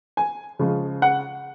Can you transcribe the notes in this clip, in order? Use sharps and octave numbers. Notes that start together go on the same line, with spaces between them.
G#5
C#3 F3 G#3
F#5